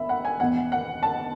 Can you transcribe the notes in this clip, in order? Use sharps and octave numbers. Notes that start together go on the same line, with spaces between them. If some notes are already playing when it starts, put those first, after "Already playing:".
Already playing: B2 E5 B5
F#5
G#5
E2 B2 F#5
F#5
A5